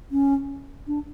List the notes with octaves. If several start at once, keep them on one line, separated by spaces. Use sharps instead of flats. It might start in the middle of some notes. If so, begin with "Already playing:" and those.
C#4
D4